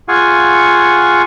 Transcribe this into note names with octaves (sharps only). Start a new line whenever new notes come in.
F4 G#4 F5 F#5 G#5 C#6